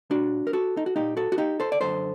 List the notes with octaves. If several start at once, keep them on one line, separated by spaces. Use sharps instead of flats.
C2 A#2 D4 F#4
A#4
F#4 A4
D#4
F#4
C2 A#2 D#4 G4
F#4 A4
F#4
D#4 G4
A4 C5
D5
F#2 D3 A4 C5